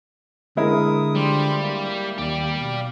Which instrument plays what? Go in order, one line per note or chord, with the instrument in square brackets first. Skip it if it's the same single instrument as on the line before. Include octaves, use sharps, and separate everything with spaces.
[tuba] D3 [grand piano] G#3 E4 A#4 [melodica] D#6
[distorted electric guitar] G3 [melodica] F4 G4 C5
[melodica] A#3
[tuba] D#2 [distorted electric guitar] G4 D5
[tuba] B2 [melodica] F5